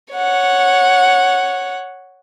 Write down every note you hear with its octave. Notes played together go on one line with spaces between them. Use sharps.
C#5 F#5